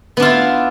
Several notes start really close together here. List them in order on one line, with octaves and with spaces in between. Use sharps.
B3 D4 F4 E4